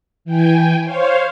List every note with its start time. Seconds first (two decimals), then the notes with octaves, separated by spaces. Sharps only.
0.25 E3 G5 G#5
0.84 C5 C#5 F5